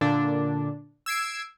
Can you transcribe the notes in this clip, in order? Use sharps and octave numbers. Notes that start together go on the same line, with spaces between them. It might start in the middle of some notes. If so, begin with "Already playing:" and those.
A#2 D3 D4
E6 G#6 C7 D7